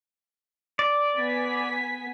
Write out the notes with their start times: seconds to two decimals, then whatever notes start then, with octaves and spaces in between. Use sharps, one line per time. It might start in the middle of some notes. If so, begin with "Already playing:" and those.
0.79 D5
1.17 B3 G#5 B6